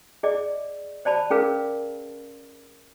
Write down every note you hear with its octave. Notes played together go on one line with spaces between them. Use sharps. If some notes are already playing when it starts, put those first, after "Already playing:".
G#4 D5 D#5
C5 D5 A5 B5
C#4 G#4 A#4 B4 F5